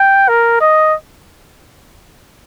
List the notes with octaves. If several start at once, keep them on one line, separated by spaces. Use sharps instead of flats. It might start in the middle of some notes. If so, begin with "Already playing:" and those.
Already playing: G5
A#4
D#5